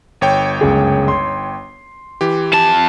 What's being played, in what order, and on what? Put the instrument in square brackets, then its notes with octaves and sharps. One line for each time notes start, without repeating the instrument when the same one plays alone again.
[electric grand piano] G1 C#5 G5
[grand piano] F#1 C#2 G#4
C6
[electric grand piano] E3 G4
[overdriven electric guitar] F2 A5